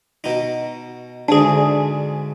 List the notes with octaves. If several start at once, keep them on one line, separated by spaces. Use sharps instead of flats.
B2 D#4
D2 G#2 D4 G#4